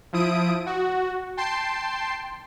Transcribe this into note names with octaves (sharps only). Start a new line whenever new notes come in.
F3 E4 D#6 D7 D#7
F#4
G5 A5 C6 C7